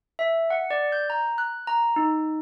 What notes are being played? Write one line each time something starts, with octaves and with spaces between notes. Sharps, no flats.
E5
F#5
D5
G6
A#5
F#6
A#5
D#4